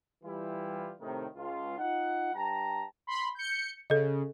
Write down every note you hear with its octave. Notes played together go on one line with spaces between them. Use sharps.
E3 G3 E4 F4 G4
A2 C3 D#3
C#2 F4
D#4 F4 F#5
G2 G5 A5 A#5
B5 C6
G6 C#7
C#3 A4 D#5